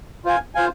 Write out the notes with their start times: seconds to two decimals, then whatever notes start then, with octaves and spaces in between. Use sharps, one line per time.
0.25 F4 C5 F5 G#5
0.55 F4 C5 F5 G#5